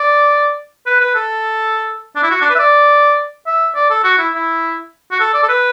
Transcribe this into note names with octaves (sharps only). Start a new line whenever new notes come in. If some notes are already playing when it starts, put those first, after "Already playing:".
Already playing: D5
B4
B4
A4
D4
E4
F#4
D4
B4
E5
D5
E5
D5
A4
F#4
E4
E4
F#4
A4
D5
A4
B4